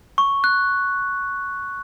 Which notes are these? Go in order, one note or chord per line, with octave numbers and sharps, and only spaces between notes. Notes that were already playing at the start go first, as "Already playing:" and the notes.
C#6
F#6